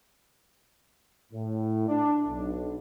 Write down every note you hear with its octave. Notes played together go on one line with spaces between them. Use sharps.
A2
D4
B1